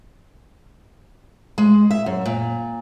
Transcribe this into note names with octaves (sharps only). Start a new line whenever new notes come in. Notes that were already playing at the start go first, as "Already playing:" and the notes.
G#3
E5
F#2
A#2